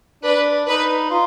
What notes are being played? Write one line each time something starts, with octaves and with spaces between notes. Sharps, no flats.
D4 B4
D#4 B4
F4